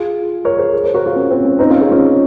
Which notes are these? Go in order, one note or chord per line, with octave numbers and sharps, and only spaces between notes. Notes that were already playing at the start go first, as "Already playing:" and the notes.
Already playing: F4 G#4
A#4 C#5
G#4 C5
G#4 C5
A#4 C#5
F#4 A#4
F4 G#4
C#4
C4
C#4
C4 D#4
C#4 F4
F4 G#4
C#4 F4